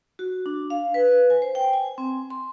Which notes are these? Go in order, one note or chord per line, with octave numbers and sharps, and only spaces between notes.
F#4
D4
F5
B4
G#5
C5
G5
G#5
C4
C6